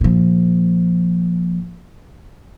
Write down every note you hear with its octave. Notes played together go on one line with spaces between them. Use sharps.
A#2 F3